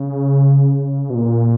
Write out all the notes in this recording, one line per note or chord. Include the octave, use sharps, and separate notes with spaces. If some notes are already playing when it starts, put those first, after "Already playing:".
Already playing: C#3
B2
A#2